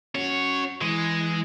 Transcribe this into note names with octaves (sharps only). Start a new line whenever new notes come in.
C#4 F#4 C#5
E3 G#3